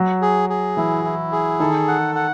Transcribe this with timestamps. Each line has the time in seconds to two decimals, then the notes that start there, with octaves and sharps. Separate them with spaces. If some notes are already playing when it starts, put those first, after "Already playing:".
Already playing: F#3
0.22 G#4
0.49 G#4
0.77 E3 E4
1.05 E4
1.32 G#4
1.60 D#3 A4
1.88 F#5
2.16 F#5